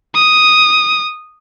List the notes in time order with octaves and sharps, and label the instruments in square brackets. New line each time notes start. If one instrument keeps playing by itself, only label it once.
[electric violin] D#6